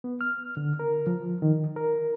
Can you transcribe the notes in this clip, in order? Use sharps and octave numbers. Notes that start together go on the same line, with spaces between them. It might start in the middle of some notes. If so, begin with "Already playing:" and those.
B3
F6
D3
A#4
F3
D#3
A#4